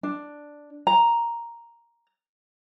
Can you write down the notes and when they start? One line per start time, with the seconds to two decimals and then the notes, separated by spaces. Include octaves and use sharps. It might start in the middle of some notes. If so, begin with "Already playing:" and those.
0.03 D4
0.87 A#5